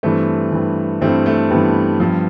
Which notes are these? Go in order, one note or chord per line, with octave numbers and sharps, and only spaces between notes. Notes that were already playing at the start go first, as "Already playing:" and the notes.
G2 E3 A3 C4
G2 E3
G2 E3 A3 C4
A3
G2 E3 B3
G2 F3